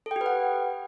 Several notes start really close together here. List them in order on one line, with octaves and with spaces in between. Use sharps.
A4 G5 G4 B4 F#5